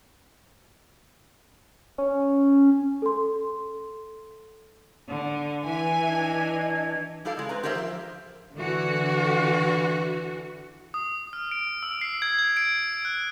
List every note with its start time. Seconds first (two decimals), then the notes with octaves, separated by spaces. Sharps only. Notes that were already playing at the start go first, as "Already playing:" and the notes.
1.98 C#4
3.02 A4 C6
5.07 D3
5.64 E3 E5 G#5
6.08 D4 D#5 G#6
7.25 G3 E4 G4 A4 F5
7.37 C#3 G#3
7.49 C4 B4 A#5
7.63 G4 G#4 A#4 C5 D#5 E5
7.75 F3 E5
8.54 D3 E3 F#4
10.94 D#6
11.33 F6
11.51 D7
11.83 E6
12.01 C7
12.22 G#6
12.39 G#6
12.57 D7
13.05 F#6